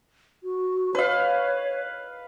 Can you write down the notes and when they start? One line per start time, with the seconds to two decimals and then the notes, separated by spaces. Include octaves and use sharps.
0.43 F#4
0.95 B4 C#5 F5